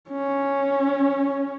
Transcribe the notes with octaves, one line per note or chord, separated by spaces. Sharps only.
C#4